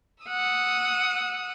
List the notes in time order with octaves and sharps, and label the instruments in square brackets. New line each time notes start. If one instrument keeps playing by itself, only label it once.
[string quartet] F#5 D#6 E6